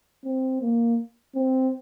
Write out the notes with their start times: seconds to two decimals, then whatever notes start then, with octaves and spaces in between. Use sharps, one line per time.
0.24 C4
0.61 A#3
1.35 C4